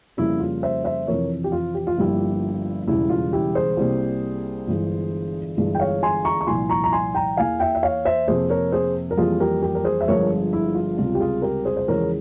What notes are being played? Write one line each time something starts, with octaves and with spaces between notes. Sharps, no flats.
F2 C#3 G3 A#3 E4
F4
C5 E5
C5 E5
F2 C3 E3 A#4 C#5
G4
F4
G4
F4
G1 G2 F3 A#3 E4 G4
E1 E2 C#3 G3 E4
F4
E4 G4
G#4 C5
C2 C3 G3 A#3
G1 G2 E3 G#3
G1 G2 E3 G#3
G5
C#5 F5
G#5 C6
A#5 C#6
C#6
C2 A#2 F3 G#5 C6
A#5 C#6
A#5
G#5 C6
G5 A#5
E2 E3 A#3 F5 G#5
E5 G5
E5
C#5 F5
C5 E5
F2 C3 F3 A#3 G#4 C5
A#4 C#5
G#4 C5
A#4
F2 E3 G3 A#3 F4 G#4
G4 A#4
G4 A#4
A#4
G#4 C5
E5
G1 G2 F3 G#3 A#4 C#5
E4
F4
C#2 C3 G3 F4
G4
F4 G#4
G4 A#4
G#4 C5
C5
E2 C#3 F3 G#3 A#4 C#5